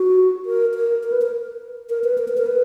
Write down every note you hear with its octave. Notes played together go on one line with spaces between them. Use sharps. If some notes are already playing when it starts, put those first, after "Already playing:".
Already playing: F#4
A#4
A#4
A#4
B4
A#4
A#4
B4
A#4
B4
A#4
B4